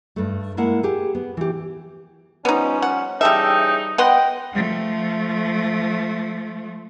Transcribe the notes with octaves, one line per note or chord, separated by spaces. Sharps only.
G2 A3
G#3 A#3 E4 F#5
G4 G#4
B3
E3 G4
F3 G3 B3 C#4 D#4
F#5
C#3 E3 G3 D#4 A4 E5 G5
B3 D#5 F#5 G5 C6
F3 A3